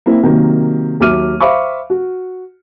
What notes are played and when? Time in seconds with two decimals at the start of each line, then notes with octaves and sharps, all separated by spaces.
0.06 A#3 C4 E4
0.23 C3 D#3 F#3 A#3
1.00 D#2 F#3 E5 D6 F6 D#7
1.40 C5 E5 F5 B5 C#6 D6
1.90 F#4